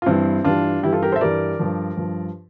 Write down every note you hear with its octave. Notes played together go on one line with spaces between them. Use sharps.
F4
G2 E3 G3 C4 E4
G2 E3 G3 D4 F4
G2 E3 G3 E4 G4
F4 A4
G4 A#4
A4 C5
E5
G2 E3 G3 A#4 D5
G2 F3
G2 F3